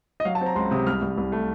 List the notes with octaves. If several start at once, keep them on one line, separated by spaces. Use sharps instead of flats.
D#5
F#3 F5
A5
C4
A#5
C#2 C6
C3 D#6
C2 F6
C2
C2
A3